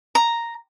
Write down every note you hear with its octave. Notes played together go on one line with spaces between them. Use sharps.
A#5